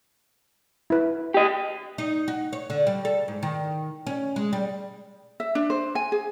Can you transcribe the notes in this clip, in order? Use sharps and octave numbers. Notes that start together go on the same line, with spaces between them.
E4 B4
G4 D#5
D#4
F#4
C#5
D3
G3
A4
G#2
D#3
C#4
G#3
G3
E5
D4
C5
G#5
G#4